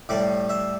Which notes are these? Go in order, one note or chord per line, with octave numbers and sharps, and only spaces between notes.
A2 G3 D5
E5